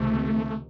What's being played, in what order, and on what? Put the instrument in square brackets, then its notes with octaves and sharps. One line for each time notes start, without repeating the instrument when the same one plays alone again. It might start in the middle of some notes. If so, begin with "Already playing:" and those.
Already playing: [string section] C#2 C3 D#3 [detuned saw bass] A3